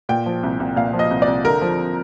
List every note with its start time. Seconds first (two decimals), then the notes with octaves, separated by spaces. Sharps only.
0.09 A#2 G5
0.26 F3
0.43 C2
0.60 C2
0.76 A#2 F5
0.93 F3
0.99 D#5
1.11 C2
1.22 D5
1.27 C2
1.44 D3 A#4
1.62 F3